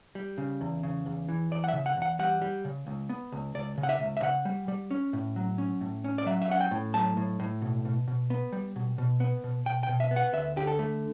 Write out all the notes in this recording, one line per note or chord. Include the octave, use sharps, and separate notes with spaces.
G3
C#3
E2
C#3
E2
E3
E2 D5
F#5
E5
C#3
F#5
E2 F#5
G3 F#5
G3
C#3
C#2
B3
C#2
C#2 D5
C#3
F#5
E5
C#2
E5
C#3 F#5
G3
G3
C#4
A2
F#3
C#4
A2
C#4
D5
F#3 E5
E5
C#4 F#5
G5
A2
F#3 A5
A2
A2
B2
B2
B2
B3
G3
B2
B2
B3
B2
B2 G5
G5
B2
E5
B3
F#5
D2 E5
D3 G4
A4
A3